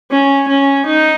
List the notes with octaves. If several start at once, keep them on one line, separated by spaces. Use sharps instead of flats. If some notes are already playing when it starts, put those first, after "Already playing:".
C#4
C#4
D#4